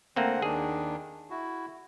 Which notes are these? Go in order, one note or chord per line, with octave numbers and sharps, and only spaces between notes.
D3 A3 A#3 C4 F#5
D#2 D#3 D4 G#4
E4 F#4